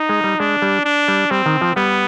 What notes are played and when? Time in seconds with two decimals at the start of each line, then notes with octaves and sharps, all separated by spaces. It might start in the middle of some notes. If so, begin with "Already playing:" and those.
Already playing: D#4
0.09 G#3
0.24 G3
0.39 G#3 D4
0.62 G3
0.85 D4
1.08 G3
1.31 G3 C4
1.46 D#3
1.61 F3
1.76 G3 B3